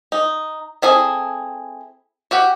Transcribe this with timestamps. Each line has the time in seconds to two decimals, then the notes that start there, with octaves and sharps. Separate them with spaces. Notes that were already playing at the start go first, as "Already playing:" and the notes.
0.12 D#4
0.82 C4 E4 G#4 A4
2.31 F#4 G4 F#5